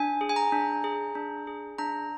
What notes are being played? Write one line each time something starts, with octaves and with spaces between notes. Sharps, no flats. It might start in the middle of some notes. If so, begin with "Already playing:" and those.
Already playing: D4 G#5
G#4
G#5
A#5
D4
G#4
D4
G#4
D4 A#5